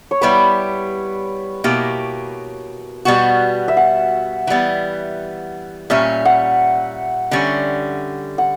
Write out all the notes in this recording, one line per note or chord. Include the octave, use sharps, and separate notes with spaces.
C#5
G3 B3 E4 G4 B4
B2 A#3 E4 G4
B2 G3 B3 F#4
E5
F#5
E3 G3 B3
A#2 G3 C#4 E5
F#5
D3 G3 C#4
F#5